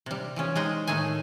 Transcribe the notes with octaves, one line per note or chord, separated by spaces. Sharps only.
C3 G3
E3 F3 C#4
G#3 D#4 G#4 G5
A2 D#3 A3 G#4 G#5